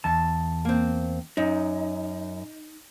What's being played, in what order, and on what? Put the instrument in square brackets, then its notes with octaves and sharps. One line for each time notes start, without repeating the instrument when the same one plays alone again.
[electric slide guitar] E2 A5
[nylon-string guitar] A#3 C4
[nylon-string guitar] F#2 [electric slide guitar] D#4